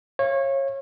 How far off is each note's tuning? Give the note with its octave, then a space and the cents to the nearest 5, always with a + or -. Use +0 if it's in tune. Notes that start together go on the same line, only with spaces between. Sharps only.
C#5 -25 F5 -35